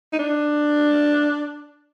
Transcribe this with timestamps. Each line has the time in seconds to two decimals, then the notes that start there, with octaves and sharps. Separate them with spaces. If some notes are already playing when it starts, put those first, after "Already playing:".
0.13 D#4
0.19 D4